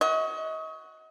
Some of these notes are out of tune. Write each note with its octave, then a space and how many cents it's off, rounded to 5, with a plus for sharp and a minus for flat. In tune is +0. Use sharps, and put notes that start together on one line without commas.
F#4 +0 D#5 +35